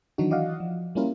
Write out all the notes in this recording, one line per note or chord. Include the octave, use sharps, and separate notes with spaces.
D#3 E3 F#3 D4 D#4 F#4
E3 F#4 D5 D#5 F5 F#5
F3
G3 A#3 C#4 E4 F4 A#4